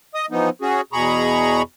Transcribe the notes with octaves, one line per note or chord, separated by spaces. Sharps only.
D#5 D#6
E3 F3 B3 D#4
C#4 F#4 G#4
E2 B2 G#4 A#5 B5 C#6